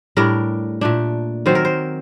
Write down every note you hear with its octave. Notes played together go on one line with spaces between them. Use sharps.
A2 G3 D4 A#4
A#2 A3 D4
D#3 F#3 C4 C5
A#4
C5